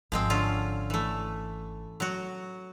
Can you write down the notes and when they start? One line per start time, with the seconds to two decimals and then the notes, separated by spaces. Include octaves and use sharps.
0.12 G#1 F3 G#3 C4
0.30 D3 C#4 F4
0.90 E3 A3
2.00 F#3 F#4